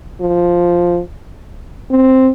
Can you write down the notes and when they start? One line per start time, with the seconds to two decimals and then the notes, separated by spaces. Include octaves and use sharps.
0.21 F3
1.91 C4